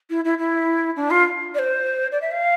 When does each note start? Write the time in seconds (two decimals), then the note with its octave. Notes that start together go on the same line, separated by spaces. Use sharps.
0.10 E4
0.24 E4
0.38 E4
0.96 D4
1.10 F4
1.54 D5
1.59 C5
2.12 D5
2.21 E5
2.31 F5